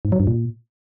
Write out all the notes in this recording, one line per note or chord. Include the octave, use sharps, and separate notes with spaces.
G#2
F#3
G2
A#2